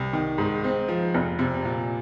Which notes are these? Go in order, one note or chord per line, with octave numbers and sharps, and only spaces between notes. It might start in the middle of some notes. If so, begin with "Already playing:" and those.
Already playing: C2
D#3
G#2
C4
F3
F1
C3
A#2